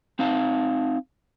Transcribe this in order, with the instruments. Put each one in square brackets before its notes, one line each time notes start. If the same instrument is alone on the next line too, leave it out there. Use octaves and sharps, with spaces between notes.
[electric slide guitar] C4 D#4 F5 A5